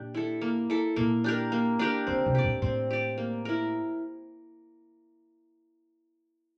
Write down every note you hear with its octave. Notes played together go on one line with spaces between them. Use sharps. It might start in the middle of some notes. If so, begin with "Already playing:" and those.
Already playing: A#2 D4 G4
E4 A4
A#3
E4 A4
A#2 A#3
D4 G4 A#4
A#3
D4 G4 A#4
D3 C4
C3
G4 D5
A#2
A2 C4
G4 D5
A#3
E4 A#4